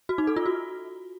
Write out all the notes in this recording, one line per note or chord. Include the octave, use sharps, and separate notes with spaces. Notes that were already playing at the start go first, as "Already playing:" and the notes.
F#4
D#4
A4
F4
F#4